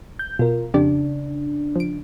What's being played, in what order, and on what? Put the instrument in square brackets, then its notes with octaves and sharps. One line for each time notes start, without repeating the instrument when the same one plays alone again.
[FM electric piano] G6
[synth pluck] B2 [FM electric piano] F4 A#4
[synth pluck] F2 G4 D5 [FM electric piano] C#3 D4
[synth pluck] F3 D7